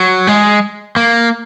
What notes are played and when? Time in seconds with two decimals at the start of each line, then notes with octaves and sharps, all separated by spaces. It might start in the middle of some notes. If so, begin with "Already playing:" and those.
Already playing: F#3
0.27 G#3
0.96 A#3